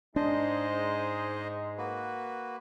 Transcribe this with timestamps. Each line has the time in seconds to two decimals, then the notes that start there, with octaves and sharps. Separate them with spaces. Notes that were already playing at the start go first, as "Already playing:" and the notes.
0.16 G#2 G#3 D4 D#4 C5 D#5
1.78 A#3 F#4 B4